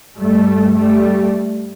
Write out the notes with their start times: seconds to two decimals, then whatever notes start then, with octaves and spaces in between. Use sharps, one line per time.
0.18 G2 G3 A3
0.74 G3 A3